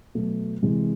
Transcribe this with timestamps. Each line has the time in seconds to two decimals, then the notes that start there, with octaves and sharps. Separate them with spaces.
0.15 B2 F#3 A3
0.62 C3 E3 G#3